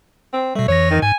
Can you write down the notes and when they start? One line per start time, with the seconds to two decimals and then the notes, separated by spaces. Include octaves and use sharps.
0.33 C4
0.55 B2 G3 A3
0.68 F2 E3 C#5 A#6
0.91 D#3
1.02 G#2 G#5